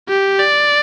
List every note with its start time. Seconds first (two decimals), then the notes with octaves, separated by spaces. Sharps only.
0.09 G4
0.39 D5